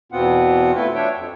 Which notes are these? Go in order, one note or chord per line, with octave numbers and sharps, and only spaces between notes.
E2 B2 B3 C4 F4 F#5
A3 E4 F4 B4
D4 C#5 E5 G5
F2